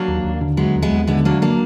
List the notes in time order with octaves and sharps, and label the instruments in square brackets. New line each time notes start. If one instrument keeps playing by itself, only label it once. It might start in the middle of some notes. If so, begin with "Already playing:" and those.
Already playing: [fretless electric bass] F#3 [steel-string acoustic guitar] A#3 D4
[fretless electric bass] D#2
D#2
D3
[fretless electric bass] F#3 [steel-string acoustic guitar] G#3 B3
[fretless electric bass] D#2
[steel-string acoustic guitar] G#3 B3
[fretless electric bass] D#2
[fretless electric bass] D3 [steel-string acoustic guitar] G#3 B3
[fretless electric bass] F#3 [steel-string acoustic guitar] A#3 D4
[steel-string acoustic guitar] A#3 D4